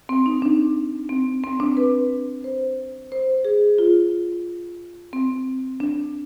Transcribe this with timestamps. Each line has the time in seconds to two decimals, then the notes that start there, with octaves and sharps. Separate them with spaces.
0.09 C4
0.26 D#4
0.42 D4
1.09 C4
1.44 C4
1.60 D4
1.77 B4
2.44 C5
3.12 C5
3.45 G#4
3.78 F4
5.13 C4
5.80 D4